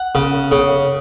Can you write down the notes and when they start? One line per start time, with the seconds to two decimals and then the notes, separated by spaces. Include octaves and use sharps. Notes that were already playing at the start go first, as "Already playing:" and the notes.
Already playing: F#5
0.15 C#3
0.51 C#3